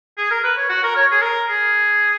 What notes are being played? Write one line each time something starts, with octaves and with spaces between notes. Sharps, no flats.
G#4
A#4
B4
C#5
F#4
A#4
C#5
G#4
A#4
G#4